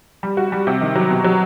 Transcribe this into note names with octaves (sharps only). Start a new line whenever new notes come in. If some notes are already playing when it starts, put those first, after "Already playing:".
G3
F#4
G3
C3
D#3
F#3
B2
F#3